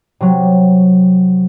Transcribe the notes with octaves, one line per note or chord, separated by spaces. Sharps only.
C3 F#3